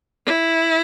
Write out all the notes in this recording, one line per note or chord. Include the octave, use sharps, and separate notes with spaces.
E4